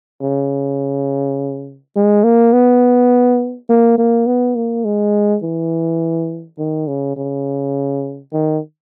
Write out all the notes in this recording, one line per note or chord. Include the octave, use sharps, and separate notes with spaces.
C#3
G#3
A#3
B3
A#3
A#3
B3
A#3
G#3
E3
D#3
C#3
C#3
D#3